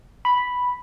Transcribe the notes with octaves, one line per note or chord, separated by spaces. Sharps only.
B5